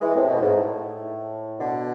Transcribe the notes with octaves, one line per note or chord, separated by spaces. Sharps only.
E3 G#3
A2 C3
B2
A2
G#2
A2
B2 D3